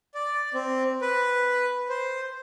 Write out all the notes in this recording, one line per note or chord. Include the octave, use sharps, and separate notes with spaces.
D5
C4
B4
C5